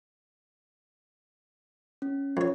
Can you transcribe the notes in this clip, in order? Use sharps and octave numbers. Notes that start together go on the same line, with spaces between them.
C#4
F2 C#5